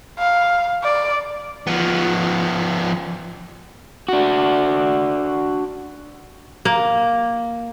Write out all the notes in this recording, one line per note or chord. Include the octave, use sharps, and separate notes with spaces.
F5
D5
F3 B3
D4 F#4
A#3